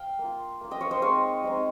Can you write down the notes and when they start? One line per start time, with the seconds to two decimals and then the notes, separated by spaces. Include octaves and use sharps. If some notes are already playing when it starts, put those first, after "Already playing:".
Already playing: F5 G5
0.19 A#3
0.24 F4
0.61 A#3 F4
0.71 D#5 G5
0.81 C#5 F5
0.91 C5 D#5
1.02 G#3 C4 D#4 C#5 F5
1.44 G#3 C4 D#4